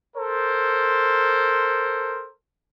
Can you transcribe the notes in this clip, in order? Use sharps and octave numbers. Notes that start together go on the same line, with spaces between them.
A4 A#4 C5